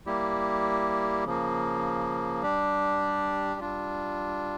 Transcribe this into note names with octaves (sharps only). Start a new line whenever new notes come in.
G3 A#3 E4 G4
C#3 F3 A#3
G3 D4 G4
G3 D4 F4